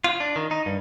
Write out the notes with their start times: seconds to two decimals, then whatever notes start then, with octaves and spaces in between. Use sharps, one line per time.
0.04 F4
0.20 D4
0.36 D#3
0.51 D#4
0.66 G2